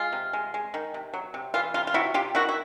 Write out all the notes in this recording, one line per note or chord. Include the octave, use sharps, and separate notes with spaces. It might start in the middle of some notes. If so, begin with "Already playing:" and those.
Already playing: G#3 F4
C3
G#3
G#3
D#3
C3
F#3
C3
E3 F4
C3 F4
F4
C3 E4 F#4
C3 F4 G4
D#3 E4 F#4
E4